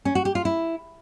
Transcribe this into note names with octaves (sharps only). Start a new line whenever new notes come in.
C#4
F#4
G4
F4
E4